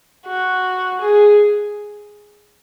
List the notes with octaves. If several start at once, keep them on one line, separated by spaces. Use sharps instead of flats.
F#4
G#4